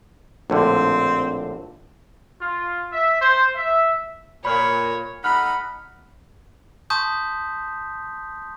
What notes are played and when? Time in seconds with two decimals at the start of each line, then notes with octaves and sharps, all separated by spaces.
0.50 A#1 A2 D3 C4
2.40 F4
2.92 E5
3.20 C5
3.55 E5
4.45 A#2 C#5 B5 F6
5.24 D#4 A4 F#5 B5 F6 F#6
6.90 A5 C6 C#6 D#6 G6 B6